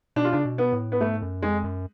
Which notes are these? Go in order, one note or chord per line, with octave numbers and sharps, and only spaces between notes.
B2 D4
F4
C#3 D4
B2
B3
A2
B3
G#2 A3
F#2
F2 G#3
F#2